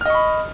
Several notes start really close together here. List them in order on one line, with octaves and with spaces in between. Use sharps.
F6 D#5 C#6 B5